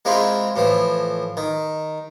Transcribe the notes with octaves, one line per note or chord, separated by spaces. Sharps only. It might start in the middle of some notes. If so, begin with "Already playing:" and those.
G#3 A#3 C4 E4 F4
A2 E3 F3
D#3